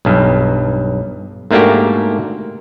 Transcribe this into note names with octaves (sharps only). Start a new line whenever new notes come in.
B1 G2
G#2 A3 A#3 D4 F#4 G4